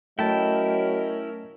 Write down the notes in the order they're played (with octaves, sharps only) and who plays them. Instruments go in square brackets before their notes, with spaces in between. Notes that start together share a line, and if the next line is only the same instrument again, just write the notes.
[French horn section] F#3 D#5 [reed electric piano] A3 A5 [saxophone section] C#4 A#4 [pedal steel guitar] E4 G5